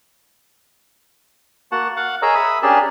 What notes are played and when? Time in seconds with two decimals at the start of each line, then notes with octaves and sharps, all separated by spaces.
1.72 A#3 F#4 F#5 A5
1.97 F5 F#5
2.22 G#4 A#4 C#5 D#5 A#5 E6
2.35 E5 B5 D#6
2.63 C#4 D4 G4 G#4 A#4 A5